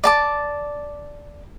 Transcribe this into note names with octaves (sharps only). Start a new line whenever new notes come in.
D5 A5 D6